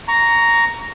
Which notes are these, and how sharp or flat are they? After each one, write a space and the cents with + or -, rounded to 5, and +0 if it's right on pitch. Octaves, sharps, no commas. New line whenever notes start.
A#5 +0 C#6 +25